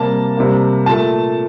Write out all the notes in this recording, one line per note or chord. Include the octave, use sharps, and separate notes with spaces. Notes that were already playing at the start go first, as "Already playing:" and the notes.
Already playing: C3 G3 A#3 A5
C3 G3 A#3
A#2 A3 A5